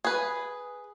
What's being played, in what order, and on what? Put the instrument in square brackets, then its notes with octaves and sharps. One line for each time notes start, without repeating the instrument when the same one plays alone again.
[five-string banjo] G#4 B4